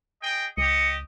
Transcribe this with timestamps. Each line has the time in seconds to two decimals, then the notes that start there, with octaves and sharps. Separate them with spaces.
0.22 G#4 D#5 G5
0.57 C#2 G4 D#5 C#7